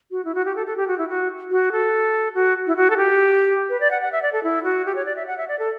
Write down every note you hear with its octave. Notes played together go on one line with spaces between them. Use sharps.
F#4
E4
F#4
G4
A4
A4
G4
F#4
E4
F#4
F#4
A4
F#4
E4
F#4
A4
G4
B4
D5
F#5
F#5
E5
D5
A4
E4
F#4
G4
C#5
D5
E5
F#5
E5
D5
A4